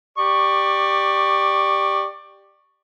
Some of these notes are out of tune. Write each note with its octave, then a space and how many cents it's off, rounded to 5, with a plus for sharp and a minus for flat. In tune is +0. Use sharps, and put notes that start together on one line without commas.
G4 +0 D5 +15 C#6 +0